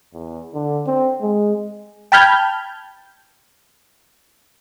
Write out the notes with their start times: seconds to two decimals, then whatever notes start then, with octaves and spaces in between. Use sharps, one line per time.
0.13 E2
0.54 D3
0.86 C4
1.21 G#3
2.12 G5 A5 B5 F6 G6 G#6